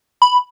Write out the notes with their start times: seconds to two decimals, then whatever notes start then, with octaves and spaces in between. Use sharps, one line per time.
0.22 B5